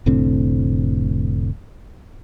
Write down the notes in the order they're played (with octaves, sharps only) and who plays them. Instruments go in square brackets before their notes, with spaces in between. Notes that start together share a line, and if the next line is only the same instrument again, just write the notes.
[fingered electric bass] F1 A2 D3 C4